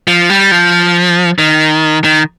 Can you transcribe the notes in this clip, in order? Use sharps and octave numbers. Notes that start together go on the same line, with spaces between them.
F3
G3
F3
D#3
D#3